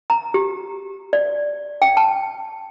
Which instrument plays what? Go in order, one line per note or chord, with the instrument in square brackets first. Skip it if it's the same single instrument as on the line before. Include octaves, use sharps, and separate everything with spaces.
[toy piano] A#5
G4
D5
G5
A5